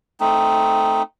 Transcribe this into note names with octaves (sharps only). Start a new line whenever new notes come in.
A3 C4 D#4